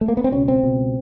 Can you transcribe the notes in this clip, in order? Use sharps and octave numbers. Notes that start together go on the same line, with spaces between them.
A3
A#3
B3
C4
C#2 B2 C#4
C4
C#2 B2